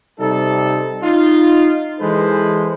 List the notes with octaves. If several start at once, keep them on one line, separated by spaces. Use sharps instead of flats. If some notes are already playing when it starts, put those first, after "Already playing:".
C3 G3 D#4 A4
D#4 F4
E3 G#3 A4 B4 C5